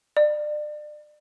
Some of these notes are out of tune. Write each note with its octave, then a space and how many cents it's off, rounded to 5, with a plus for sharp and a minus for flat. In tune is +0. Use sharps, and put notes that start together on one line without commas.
D5 +30